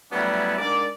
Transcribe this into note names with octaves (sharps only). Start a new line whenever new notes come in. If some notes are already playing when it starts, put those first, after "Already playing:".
F#3 G3 A3 B3 C#4 E4
G#2 D4 A#4 D5